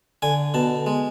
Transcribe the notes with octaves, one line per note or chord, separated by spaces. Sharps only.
D3 G#5
B2 A5
G#3